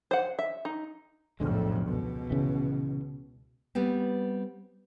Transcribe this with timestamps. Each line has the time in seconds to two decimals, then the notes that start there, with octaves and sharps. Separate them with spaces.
0.11 C5 F#5
0.39 E5
0.65 D#4
1.40 B1 F2 A2 D3 G#3
1.86 C#2 B2
2.30 C#3 E3
3.75 G3 B3 C4